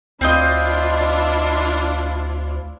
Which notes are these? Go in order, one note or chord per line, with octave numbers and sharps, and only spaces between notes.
D2 C4 D4 E4 F4 C5 D#5